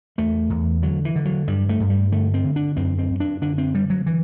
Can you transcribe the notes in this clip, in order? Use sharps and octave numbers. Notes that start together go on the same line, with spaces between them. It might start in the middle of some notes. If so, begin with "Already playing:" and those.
E2 A3
E2
D3 F#3
E3
D3
F#3
G2 G3
A3
G2
G3
D3 A3
C4
D3
D4
F#2 C4
C4
F#2
D4
D3 D4
C4
D3 G3
F#3
E3